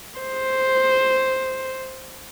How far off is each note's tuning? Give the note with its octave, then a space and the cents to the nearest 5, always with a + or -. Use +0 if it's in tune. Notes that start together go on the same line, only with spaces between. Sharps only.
C5 +0